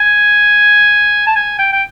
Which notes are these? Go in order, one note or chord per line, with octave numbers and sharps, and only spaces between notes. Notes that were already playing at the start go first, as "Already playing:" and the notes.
Already playing: G#5
A5
G#5
G5
G5